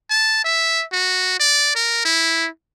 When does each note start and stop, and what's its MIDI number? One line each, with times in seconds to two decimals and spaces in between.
0.10 0.42 81
0.44 0.85 76
0.92 1.38 66
1.39 1.73 74
1.75 2.03 70
2.05 2.48 64